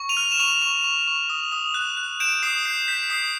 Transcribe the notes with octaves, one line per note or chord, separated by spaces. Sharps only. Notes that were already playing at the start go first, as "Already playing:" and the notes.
Already playing: C#6
D#7 F7
F6
E7
C#6 D#7 F7
C#6
C#6
C#6
D#6
D#6
F#6
F#6
G6 D7 E7
D#6 C7
G6 C7
G6 B6
D#6 C7